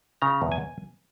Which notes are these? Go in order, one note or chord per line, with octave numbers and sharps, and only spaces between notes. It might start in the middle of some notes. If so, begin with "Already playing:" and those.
C#3 A#5
E2
G#5